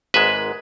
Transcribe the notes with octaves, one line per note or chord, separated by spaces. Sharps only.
G#1 G#2 G#3 B4 E5